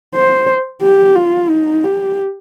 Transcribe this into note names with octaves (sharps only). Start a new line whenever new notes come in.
C5
G4
F4
D#4
G4